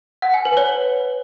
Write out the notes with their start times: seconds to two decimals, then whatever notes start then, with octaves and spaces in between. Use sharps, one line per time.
0.22 F#5
0.34 G#5
0.45 B4
0.57 C#5